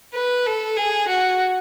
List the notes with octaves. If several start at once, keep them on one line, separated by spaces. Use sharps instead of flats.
B4
A4
G#4
F#4